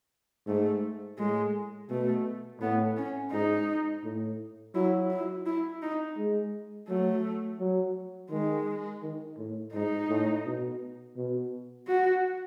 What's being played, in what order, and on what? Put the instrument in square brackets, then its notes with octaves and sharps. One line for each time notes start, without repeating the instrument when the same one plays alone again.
[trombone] G#2 [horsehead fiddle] A3
[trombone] A2 [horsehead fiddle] G#3
[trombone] B2 [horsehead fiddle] A3
[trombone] A2 [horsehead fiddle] B3
[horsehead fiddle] C#4
[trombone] G#2 [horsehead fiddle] D#4
[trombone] A2
[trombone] F#3 [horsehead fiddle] E4
[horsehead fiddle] E4
E4
D#4
[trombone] G#3
[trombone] F#3 [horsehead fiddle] A3
[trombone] F#3
[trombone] D#3 [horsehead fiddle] G#3
[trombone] D#3
A2
[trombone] G#2 [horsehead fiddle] D#4
[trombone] A2
B2
B2
[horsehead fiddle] F#4